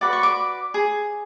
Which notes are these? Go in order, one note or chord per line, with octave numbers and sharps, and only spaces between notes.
F#4 B4 D5 D6
C#6
D6
G#4